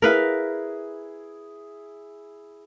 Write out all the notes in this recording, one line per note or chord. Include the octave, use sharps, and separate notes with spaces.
E4 G#4 A#4 B4 F5